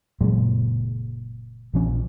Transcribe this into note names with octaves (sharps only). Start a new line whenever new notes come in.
F#1 A#2 F#3 G#3
A#1 F3 C#4